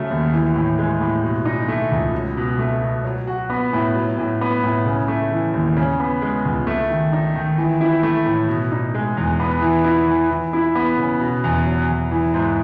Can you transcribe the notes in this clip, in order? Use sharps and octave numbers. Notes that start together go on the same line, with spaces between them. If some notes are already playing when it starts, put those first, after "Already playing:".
Already playing: C#3 F#3 A3
D#2
E3
A2
G#3
A2
B2
D#4
A3
C#2
F#3
B2
A3
B2
F#3
F#4
B3
A2
F#3
A2
B3
A2
C#3
A3
E3
D#2
C#3
B3
G#3
C#2
A3
D#3
D#4
D#3
E3
E4
A3
A2
B2
D#4
G#3
E2
B3
E3
E4
E3
E3
E4
B3
C#3
B2
E2
F#3
E2
E3
G#2